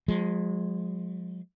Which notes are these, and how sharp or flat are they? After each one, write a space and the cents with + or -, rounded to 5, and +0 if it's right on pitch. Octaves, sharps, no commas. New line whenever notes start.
F3 +45 G#3 -5